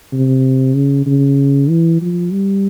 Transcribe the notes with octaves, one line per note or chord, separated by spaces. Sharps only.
C3
C#3
C#3
E3
F3
G3